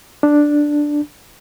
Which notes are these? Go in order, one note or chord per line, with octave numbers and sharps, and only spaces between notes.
D4